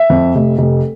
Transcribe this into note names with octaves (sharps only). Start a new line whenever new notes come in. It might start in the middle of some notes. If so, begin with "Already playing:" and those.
Already playing: E5
F2
F1
F1